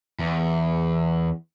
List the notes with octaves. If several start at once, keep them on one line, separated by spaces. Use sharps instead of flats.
E2